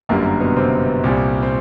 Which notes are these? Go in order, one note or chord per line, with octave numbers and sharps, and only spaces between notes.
G1 F#2 D3 G3 A#3
A#3
B2 B3
C3 C4
C2 A#2 G3
C4